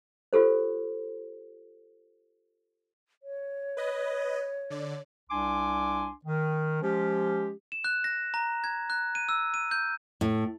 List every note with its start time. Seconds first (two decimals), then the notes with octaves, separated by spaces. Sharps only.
0.33 F4 G4 A4 C5
3.23 C#5
3.77 B4 D#5
4.70 D3 D5
5.30 C2 D4 G#5 C6 D6
6.25 D#3
6.82 F3 G#3 C#4 G4
7.72 E7
7.84 F#6
8.04 A#6
8.34 A#5
8.64 G#6
8.90 F#6
9.15 D#7
9.29 E6
9.54 D#7
9.71 G6
10.21 A2